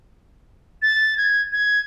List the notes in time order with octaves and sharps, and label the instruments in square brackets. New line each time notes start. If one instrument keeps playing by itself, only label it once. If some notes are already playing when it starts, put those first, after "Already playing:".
[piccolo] A6
G#6
G#6